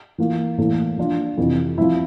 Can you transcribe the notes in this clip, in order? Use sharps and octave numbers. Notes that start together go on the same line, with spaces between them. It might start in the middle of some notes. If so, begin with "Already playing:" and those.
E3 A#3 F4 A#4
A2 E3 A#3 E4 A4
F3 A#3 D4 F4
F2 C3 E3
F3 C4 E4